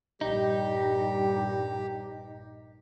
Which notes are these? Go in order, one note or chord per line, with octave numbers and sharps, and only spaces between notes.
A#1 G2 G3 D#4 G4